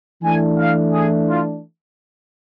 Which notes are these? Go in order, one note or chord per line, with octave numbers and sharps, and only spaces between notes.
E3 A3 D4 G#5
F5
G#4
F4